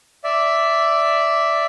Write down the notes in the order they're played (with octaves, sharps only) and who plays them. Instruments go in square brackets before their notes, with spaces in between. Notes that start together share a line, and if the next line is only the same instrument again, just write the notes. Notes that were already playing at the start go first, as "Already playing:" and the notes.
[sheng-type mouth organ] D5 E5